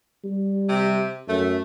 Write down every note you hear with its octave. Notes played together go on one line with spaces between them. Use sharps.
G3
C3
F#2 A3